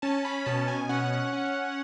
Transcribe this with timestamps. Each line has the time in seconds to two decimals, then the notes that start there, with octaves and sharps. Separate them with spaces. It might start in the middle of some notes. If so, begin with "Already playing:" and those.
0.02 C#4 A5
0.25 B5
0.46 B2 A5
0.68 G#5
0.89 C#4 F#5
1.33 C#4